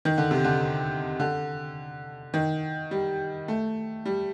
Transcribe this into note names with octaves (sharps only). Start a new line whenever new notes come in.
D#3
D3
C3
D3
D3
D#3
G3
A3
G3